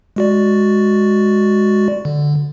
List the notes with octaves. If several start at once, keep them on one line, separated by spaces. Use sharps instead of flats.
G#3 F#4 D5
D3